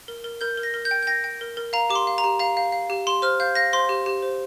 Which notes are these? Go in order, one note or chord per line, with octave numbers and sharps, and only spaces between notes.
A#4
A#4
A#4 G6
A#4
A#6
A#4
G6
G5
G6
G5 A#6
G5
A#4
A#4
F5 A#5
G4 D6
C6
F5
A#5
G4
F5 A#5
F5
F5
G4
G4 C6
C5 F6
F5 G6
F5 A#6
C5 C6
G4
G4
C5